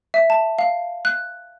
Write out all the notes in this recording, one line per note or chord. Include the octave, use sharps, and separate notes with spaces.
E5
A5
F5
F#6